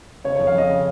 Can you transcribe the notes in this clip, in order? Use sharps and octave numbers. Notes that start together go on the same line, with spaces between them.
C#3 C#5
C#5
F2
F5
F2 D#5
C#3